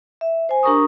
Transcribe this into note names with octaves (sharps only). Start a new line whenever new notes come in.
E5
C5 G#5
D4 G4 A#4 A#5 C#6 D#6